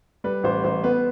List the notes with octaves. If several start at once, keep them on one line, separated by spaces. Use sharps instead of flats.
G3 B4
A1 C5
A1 C5
B3 B4